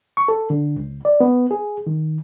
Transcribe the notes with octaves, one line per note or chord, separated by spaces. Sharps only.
C#6
A4
D3
C#2
D5
B3
G#4
D#3